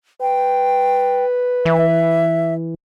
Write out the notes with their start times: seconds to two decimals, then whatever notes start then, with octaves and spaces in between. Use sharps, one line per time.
0.21 B4 G5
1.65 E3 E5